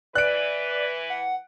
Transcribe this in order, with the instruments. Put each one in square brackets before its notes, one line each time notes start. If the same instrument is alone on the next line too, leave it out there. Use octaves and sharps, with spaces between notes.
[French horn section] E3 B4 [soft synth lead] D5 [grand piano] F#6 D7
[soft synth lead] F#5